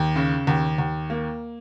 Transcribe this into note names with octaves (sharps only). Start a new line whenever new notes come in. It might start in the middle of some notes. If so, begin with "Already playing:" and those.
Already playing: D#2
C#3
D#2
D#2
A#3